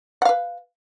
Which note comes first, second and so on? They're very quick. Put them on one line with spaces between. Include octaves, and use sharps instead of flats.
F#5 F5 B4